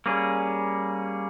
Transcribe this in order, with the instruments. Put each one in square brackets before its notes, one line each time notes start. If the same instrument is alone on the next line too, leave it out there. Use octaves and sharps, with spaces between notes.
[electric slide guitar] G3 A#3 C#4 G#4